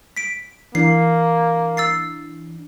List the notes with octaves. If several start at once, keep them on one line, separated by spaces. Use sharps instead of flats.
B6 D7
E3 A#3 D4 C7
E6 A6 C7